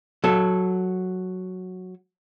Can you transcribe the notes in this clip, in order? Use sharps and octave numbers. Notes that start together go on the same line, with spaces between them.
F#3 A4